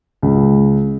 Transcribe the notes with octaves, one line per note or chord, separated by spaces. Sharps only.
C#2